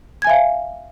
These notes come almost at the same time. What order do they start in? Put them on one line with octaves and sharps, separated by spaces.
G#6 G#5 E5 F5